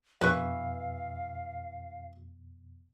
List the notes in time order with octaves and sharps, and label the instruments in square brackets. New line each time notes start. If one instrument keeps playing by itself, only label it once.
[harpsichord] A#1 [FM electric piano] F2 B2 [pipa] E3 B4 C#6 [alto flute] F5